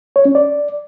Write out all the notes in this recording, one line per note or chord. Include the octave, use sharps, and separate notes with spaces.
C#5
C#4
D5